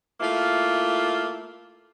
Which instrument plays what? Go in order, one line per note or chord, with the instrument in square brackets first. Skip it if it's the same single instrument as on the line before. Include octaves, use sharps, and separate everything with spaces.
[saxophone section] A3 A#3 E4 F4